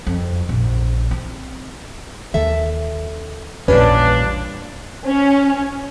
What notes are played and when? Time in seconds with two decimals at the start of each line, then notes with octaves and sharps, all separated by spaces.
0.07 F2
0.49 A#1
1.11 C4
2.34 D#2 D#3 A4 E5
3.68 A#1 E2 A#2 G3 C#4 D4 B4
5.07 C#4